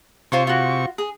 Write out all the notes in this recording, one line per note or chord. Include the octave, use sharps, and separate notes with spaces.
C3 F4 C5 C#5 C#6
F4 F#4
G#4